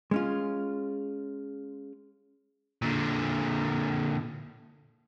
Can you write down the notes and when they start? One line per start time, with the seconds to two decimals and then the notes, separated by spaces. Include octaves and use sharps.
0.11 G#3 C#4 F4
2.82 A#2 D3